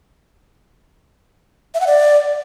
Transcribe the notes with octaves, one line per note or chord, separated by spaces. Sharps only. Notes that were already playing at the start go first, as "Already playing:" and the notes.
E5
F#5
D5